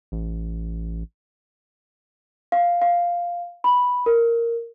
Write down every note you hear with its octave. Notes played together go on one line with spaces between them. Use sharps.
A1
F5
F5
B5
A#4